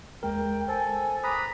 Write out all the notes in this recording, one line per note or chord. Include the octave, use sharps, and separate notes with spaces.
D#2 G#3 A#4 G5
A4 C5 G#5
B4 A#5 B5 D6 D#6